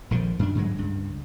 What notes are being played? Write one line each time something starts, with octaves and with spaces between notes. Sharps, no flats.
A#1 D3 D#3 F3
F#2 D4
G#2 D3 F#3 G#3
C#2 G2